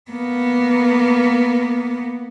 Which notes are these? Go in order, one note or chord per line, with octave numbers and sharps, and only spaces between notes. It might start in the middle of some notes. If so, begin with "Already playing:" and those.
A#3 B3